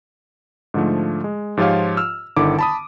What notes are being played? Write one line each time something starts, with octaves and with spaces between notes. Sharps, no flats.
G#2 D3 F3 A3
G#3
G#2 F3 F4 G4 C#5 F5
E6 F6
G1 D3 D#3 E4 D6
A5 B5 D#6